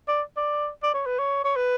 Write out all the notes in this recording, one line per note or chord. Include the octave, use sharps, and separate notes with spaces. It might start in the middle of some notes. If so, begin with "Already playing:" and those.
D5
D5
D5
C#5
B4
C#5
C#5
B4